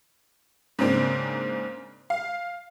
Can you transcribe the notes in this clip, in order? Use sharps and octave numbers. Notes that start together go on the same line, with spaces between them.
G#2 C#3 A#3 C4 D4
F5